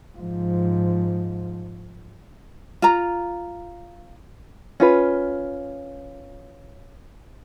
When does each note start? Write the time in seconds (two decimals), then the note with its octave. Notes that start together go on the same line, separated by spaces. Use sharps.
0.18 G#2 F3
2.82 F4 A#5
4.80 C#4 F4 B4